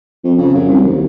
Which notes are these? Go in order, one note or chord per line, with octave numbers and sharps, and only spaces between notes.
F2
C#3
F#2
C2
D#2